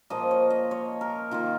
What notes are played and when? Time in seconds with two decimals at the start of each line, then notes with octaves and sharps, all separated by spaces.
0.10 A#2 F3 A#3 D#5
0.31 C#5
0.50 D#5
0.71 C#5
1.01 A#4
1.31 D#3 A#3 F4